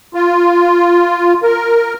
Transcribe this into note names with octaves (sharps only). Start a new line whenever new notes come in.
F4
A#4